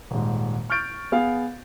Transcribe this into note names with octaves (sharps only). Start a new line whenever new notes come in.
D#1 G#2
C#6 F6 G6 A6 D7
B3 G#4 F5